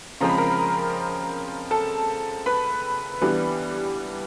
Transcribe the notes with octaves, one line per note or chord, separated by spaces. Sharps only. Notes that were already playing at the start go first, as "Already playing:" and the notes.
C#3 F3 G#3 C4 A#5
B5
A#4 A#5
A4 A5
B4 B5
E3 G3 B3 D4